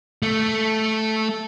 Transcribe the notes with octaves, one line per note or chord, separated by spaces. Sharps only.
A3